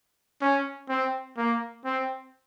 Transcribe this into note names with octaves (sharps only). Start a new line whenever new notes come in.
C#4
C4
A#3
C4